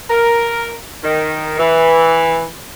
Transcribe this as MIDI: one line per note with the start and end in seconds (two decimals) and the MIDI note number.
0.10 0.73 70
1.03 1.58 51
1.59 2.44 52